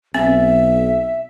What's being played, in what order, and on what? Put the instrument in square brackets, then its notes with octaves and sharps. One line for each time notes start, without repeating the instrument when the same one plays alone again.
[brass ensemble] B1 [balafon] C4 [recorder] E5